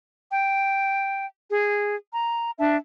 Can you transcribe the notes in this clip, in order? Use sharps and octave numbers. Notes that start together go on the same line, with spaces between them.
G5
G#4
A#5
D4 E5 A5